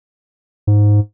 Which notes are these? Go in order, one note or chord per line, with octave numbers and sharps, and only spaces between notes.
G#2